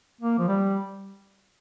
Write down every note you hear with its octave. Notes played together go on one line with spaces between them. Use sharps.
A#3
F3
G3